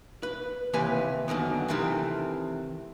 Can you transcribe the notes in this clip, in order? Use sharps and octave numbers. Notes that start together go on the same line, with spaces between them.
B4
D#2 C3 E3 G4 B4 G#5
F#2 D3 D#3 B3
C3 D#3 E3 A3 C4